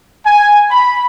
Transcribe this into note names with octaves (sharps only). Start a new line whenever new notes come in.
G#5
B5